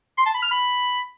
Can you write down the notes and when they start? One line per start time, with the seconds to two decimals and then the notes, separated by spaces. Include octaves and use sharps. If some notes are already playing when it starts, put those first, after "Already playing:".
0.18 C6
0.26 A5
0.34 B5
0.43 F6
0.51 B5